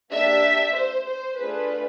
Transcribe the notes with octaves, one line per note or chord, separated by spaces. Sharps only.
A#3 D4 G4 E5
C5
C5
A3 D4 F4 G#4 B4